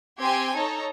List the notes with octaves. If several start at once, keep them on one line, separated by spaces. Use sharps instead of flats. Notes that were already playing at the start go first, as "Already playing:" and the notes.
C4 G4 G5 G#5 C6 G#6
D#4 A4 C#5 A#5